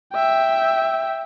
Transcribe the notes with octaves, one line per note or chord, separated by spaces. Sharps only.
E5 G5